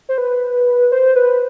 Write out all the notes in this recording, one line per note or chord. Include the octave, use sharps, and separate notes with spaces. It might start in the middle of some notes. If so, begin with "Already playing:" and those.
C5
B4
C5
B4